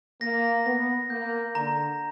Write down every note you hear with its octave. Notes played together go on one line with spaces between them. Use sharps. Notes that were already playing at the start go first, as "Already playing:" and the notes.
A#3 A#6
B3 A#6
A#3 G6
D3 A#5